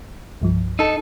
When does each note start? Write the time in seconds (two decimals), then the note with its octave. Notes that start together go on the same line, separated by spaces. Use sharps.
0.42 C2 G2 F3
0.79 D#4 A4 E6